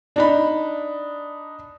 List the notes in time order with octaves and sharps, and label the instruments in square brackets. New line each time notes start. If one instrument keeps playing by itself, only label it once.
[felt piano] D4 D#4 B5